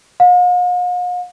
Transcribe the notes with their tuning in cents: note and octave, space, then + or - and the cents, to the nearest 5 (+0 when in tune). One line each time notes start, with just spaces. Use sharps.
F5 +45